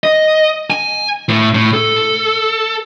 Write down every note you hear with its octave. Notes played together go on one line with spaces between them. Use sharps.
D#5
G#5
A2
A2
A4